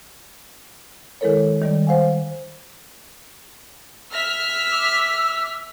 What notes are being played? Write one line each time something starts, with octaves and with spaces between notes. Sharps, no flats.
D#3 G#3 E4 A4 A#4 C#5
D#3 G3 D5
C5 F5 F#5 G#5
E5 F6 B6
D6 E6